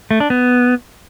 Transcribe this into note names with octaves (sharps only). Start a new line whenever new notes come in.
A3
D4
B3